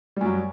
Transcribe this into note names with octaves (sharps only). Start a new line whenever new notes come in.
F#2 F#3 G3